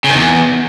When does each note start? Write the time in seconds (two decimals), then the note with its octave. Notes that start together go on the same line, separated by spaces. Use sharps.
0.04 C#3
0.09 D#3
0.15 E2